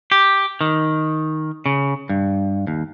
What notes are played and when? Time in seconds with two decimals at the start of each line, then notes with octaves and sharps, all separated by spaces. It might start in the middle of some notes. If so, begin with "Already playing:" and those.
0.12 G4
0.61 D#3
1.66 C#3
2.09 G2
2.67 D#2